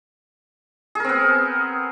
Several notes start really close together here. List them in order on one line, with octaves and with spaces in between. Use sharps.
G#4 A#4 C4 B3